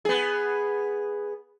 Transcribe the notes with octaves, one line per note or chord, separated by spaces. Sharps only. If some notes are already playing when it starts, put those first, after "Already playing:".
B3 G#4